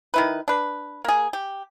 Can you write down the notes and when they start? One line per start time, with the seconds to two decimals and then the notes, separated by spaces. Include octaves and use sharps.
0.14 D#3 E4 B4
0.48 D4 B4
1.04 A#3 G#4
1.33 G4